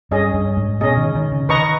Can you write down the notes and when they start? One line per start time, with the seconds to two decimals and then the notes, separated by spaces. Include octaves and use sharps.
0.11 G2 C#4 G#4 D#5
0.34 G2
0.57 G#2
0.81 B2 C#4 G#4 D#5
0.97 D#3
1.15 D#3
1.32 C#3
1.49 D#3 B4 D#5 A#5 C#6